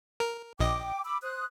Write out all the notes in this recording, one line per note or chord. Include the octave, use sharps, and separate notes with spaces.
A#4
A#1 D#5 G5 D6
B5 D6 E6
C5 D#6 F#6